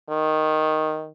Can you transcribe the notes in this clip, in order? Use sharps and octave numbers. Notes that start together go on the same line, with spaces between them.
D#3